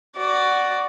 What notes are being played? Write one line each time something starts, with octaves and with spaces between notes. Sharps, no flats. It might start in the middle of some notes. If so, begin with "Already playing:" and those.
F#4 D5